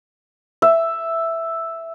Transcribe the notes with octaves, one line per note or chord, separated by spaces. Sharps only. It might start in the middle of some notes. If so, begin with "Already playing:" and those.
E5